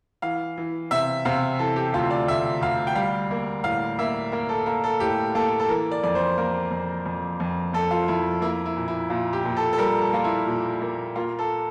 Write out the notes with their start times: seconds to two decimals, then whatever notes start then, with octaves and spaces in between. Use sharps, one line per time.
0.22 E3 F5
0.57 E3
0.91 C3 E5
1.25 C3 F5
1.59 E3 A4
1.76 G4
1.94 D2 F4
2.10 D5
2.28 D2 E5
2.61 D2 F5
2.87 G5
2.95 G3 F5
3.31 A#3
3.64 A2 F5
3.99 A#3 E5
4.32 A#3 A#4
4.49 A4
4.66 A#3 A#4
4.84 A4
5.00 A2 G4
5.35 A#3 A4
5.60 A4
5.69 E3 A#4
5.91 D5
6.03 F2 D5
6.15 C5
6.38 A#3 A#4
6.71 F2
7.06 F2
7.40 F2
7.73 F2 A4
7.91 F4
8.08 F2 E4
8.42 A#3 E4
8.66 E4
8.77 A#2
8.88 E4
9.10 A#2 F4
9.33 G4
9.45 A#2
9.57 A4
9.73 A4
9.78 G3 A#4
10.01 A4
10.13 A#3 F4
10.24 E4
10.47 A#2
10.81 A#3
11.16 A#3 F4
11.39 A4